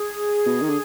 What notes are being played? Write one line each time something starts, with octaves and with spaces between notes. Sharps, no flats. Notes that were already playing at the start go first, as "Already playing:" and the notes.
Already playing: G#4
B2
D#3
D3